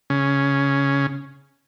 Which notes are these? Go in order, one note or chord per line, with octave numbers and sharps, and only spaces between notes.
C#3 C#4